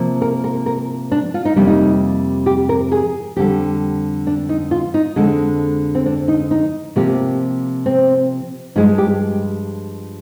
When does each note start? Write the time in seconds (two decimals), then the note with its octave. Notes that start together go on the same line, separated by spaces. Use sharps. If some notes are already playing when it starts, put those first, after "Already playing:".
Already playing: C3 F3 A#3
0.22 A#4
0.44 A#4
0.66 A#4
1.12 D4
1.34 F4
1.45 D#4
1.56 F2 C3 G3 A#3 D4
1.67 D#4
2.46 G4
2.69 A#4
2.92 G#4
3.36 F2 D3 G3 G4
4.27 D4
4.49 D#4
4.71 F4
4.94 D#4
5.16 F2 D3 G#3
5.95 C4
6.06 D4
6.28 D#4
6.51 D#4
6.96 C3 F3 A#3 G4
7.86 C4
8.76 G2 F3 G#3 D#4
8.98 G4